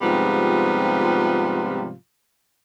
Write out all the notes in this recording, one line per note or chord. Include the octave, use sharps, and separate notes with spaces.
G#2 C3 F3 G3 B3 F4